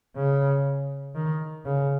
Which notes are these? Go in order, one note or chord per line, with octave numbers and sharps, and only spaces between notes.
C#3
D#3
C#3